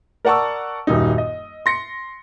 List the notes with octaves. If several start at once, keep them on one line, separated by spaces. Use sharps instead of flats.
A#4 D5 F#5 A5 C#6 E6
D#1 F#2 G3 D#4
D#5
C6 A#6 C#7